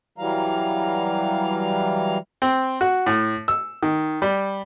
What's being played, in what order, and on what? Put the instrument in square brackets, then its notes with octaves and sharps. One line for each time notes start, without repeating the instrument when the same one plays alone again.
[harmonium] E3 F#3 G3 F5 A#5
[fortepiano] C4
F#4
A2
E6
D#3
G3